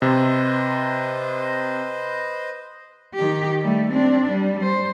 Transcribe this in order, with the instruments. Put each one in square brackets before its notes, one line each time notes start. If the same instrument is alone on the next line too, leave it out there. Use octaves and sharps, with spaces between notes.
[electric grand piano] C3 [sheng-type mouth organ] B4 C5 D#5
[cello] D#3 G4
G3 A3
C4 D4
G3
C5